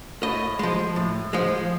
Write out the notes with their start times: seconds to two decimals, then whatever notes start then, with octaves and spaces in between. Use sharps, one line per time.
0.23 A2 D#5
0.59 F3 G#3
0.96 A2
1.33 F3 G#3